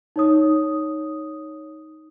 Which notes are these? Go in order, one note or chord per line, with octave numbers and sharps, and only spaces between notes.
D#4 C#5 D#6